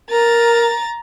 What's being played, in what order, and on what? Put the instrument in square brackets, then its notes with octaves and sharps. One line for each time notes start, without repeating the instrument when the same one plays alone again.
[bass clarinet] A#4 [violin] A#5 A6